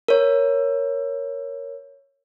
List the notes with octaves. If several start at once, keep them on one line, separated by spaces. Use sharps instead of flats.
A#4 C#5